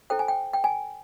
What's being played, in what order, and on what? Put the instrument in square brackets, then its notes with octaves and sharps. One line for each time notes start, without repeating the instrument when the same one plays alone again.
[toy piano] E4 A4 C5 G5
G#5
G5
G5
G#5